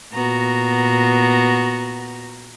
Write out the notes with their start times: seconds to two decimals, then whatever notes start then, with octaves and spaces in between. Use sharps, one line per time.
0.14 A#2 B3 F#4 A#5